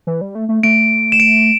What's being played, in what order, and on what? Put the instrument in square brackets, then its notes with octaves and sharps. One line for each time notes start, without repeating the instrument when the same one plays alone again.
[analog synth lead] E3
G3
A3
A3
[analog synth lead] A3 [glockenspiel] D7
[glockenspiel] E7
D7